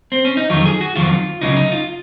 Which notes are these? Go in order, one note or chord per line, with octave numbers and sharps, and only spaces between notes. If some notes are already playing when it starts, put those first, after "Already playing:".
C4
C#4
D#4
F2 D#3 F#3 F4
G#4
F#4
F2 D#3 F#3 F4
C#2 C#3 F#3 D#4
D#4
F4